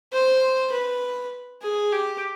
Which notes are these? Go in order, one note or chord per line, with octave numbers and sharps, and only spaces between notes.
C5
B4
G#4
G4